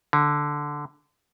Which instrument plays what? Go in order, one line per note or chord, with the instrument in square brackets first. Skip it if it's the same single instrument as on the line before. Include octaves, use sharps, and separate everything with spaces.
[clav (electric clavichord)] D3